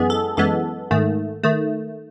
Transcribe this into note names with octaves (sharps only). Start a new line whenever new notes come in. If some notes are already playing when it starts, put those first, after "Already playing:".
Already playing: F#2 E3 G#3 B3 G#4
A4
F#2 E3 G#3 B3 A4
G#2 D#3 A3
D#3 A3